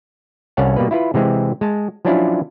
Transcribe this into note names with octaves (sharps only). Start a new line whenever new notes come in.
C2 C#4 C#5 F5 F#5 A5
B2 G3 A#3 B4
E4 F4 B4
C3 E3 G#3 C4
G#3 A5
F3 F#3 C#4 D4 E4 F4